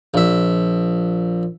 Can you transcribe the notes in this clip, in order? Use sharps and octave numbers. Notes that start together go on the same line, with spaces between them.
A#1 E5